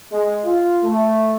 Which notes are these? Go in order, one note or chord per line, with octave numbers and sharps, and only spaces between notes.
G#3
F4
A3